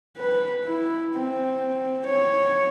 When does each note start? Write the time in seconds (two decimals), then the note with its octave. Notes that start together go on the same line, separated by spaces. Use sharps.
0.17 B4
0.64 E4
1.15 C4
2.06 C#5